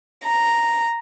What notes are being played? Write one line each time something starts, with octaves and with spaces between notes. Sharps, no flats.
A#5